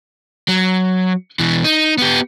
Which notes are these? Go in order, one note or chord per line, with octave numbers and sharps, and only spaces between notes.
F#3
B2 E3
D#4
B3 G4